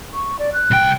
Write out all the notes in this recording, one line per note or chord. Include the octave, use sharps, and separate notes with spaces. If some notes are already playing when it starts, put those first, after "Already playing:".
C#6
D5
F#6
C2 G5